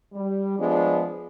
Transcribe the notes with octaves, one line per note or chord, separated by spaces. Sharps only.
G3
F3 G#3 B3 D4